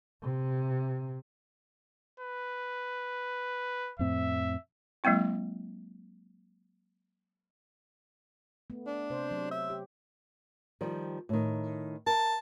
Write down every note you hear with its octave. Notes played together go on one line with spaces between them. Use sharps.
C3
B4
F2 A2 C4 E5
F#3 G#3 A#3 C4 E4
A3 B3
D4
C3 C5
F#3
E5
G4
D#3 F3 G3
A2 D#3
A#4 A5